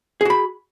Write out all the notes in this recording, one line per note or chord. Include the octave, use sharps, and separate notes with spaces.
F#4 G#4 B5